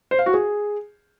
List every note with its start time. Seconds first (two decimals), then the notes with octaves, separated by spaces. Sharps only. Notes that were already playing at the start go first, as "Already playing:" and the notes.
0.11 C5
0.19 F5
0.26 F#4
0.34 G#4